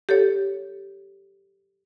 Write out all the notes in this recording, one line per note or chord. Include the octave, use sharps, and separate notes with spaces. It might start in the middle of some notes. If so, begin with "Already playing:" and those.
G4 A4 C#5